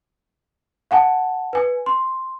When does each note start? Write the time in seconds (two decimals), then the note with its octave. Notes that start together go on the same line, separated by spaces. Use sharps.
0.91 F5 F#5 G#5 A5
1.53 B4 G#5
1.86 C6